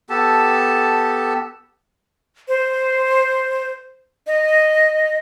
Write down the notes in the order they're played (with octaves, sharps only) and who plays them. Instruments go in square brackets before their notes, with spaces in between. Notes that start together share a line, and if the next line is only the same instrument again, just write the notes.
[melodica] B3 G4 A4 A5
[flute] C5
D#5